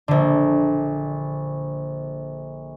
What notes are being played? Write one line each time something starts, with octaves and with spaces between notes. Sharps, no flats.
A#1 D3